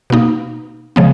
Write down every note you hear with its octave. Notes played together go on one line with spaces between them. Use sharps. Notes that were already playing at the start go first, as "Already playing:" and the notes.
B2 A#3 D#4
C#3 F3 G#3 B3